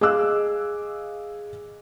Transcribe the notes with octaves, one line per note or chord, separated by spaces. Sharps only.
G#4 D#5 F5 D6 E6 F#6